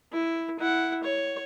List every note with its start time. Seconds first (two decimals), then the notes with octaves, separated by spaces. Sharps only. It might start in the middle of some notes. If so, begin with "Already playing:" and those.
0.12 E4
0.59 E4 F#5
1.04 C#5